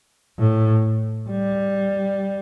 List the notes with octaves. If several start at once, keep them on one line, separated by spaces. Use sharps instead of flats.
A2
G3